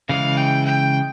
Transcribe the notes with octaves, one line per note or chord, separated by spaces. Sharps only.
C#3 E3 G#3 F5
G5
G5